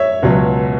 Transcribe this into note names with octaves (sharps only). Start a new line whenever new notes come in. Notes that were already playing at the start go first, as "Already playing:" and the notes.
Already playing: C#5 E5
C#2 B2 F#3